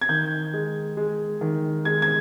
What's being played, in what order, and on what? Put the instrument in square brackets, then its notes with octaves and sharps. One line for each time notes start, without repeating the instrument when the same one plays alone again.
[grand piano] G#6
D#3 G6
G#3
G#3
D#3
G#3 G#6
G#6